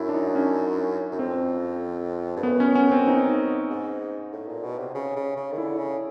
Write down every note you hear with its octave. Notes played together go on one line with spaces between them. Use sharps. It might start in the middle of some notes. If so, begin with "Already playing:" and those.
Already playing: F#2 E4
D4
D#4
C#4
F#2
F2 C4
G2
F#2 B3
C#4
C#4
C4
D#4
G#2
A2
A#2
B2
C3
C#3
C#3
C#3
D#3
D3 E4
C#3